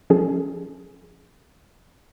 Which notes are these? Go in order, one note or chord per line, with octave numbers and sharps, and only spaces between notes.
F3 C#4 G#4 A4